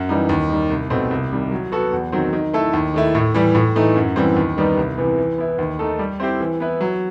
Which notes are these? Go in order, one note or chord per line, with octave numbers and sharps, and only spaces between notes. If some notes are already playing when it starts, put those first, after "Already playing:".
Already playing: F#2
E3 G3 D#4
D#2
D#3 G3
C2
B2 A3 C4
C2
C3 D#3 G3
F#3
B3 F#4 A4
E2
D#3 F#3 C4
D#3
A3 E4 A4
D#2
D#3 A3 E4
A2
E3 G3
A2
E3 A3 D#4
F#2
E3 G3 C4
D#2
D#3 G3 B3 D#4
C2
C3 E3 B3
E3
B3 E4
D#2
D#3 A3 D#4 A4
G3
C4 E4 G4 C5
E3
B3 E4 B4
F#3